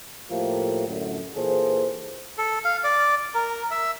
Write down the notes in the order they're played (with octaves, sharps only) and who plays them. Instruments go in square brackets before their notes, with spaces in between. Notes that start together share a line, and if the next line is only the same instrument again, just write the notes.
[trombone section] A2 F3 A3 A#3 G4
F#2 A2 D3
A#2 E3 G#4 A4 C5
[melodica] A4
F5
D5
A#4
E5